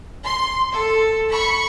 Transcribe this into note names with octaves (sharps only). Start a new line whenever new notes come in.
C6
A4
B5 C#6